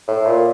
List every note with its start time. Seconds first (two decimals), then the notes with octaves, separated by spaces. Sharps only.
0.08 A2
0.26 A#2